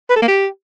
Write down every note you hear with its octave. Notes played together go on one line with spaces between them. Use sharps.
B4
A4
A#3
G4